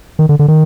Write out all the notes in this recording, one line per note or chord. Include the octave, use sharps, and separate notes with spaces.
D#3
D3
D3
D#3